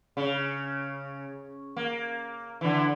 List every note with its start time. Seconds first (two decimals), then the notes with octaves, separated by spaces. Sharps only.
0.17 C#3
1.76 A#3
2.61 D3 E3